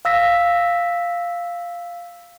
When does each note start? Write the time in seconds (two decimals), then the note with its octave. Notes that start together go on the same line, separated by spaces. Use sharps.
0.05 F5 E6 A#6 B6